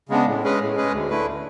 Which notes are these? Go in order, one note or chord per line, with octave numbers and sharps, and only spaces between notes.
C#3 G#3 B3 D4
A2
G#3 C#4 G#4 B4
A2
G#3 C#4 G#4 B4
D2
D3 A3 E4 B4